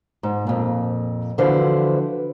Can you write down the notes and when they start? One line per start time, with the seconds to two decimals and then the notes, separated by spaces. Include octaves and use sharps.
0.23 G#2
0.47 F2 A#2
1.38 D3 E3 F3 F#4 B4 C5